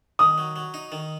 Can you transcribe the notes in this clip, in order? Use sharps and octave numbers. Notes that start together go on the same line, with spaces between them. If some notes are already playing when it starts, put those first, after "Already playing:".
D#3 D#6
F#3
F#3
D#4
D#3